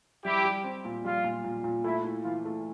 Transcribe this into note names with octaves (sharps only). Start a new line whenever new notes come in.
G3 E4 G4
G3
C4
A#2
G3 F4
A#2
A#2
A#2
A3 E4
E4
E3 F4
A3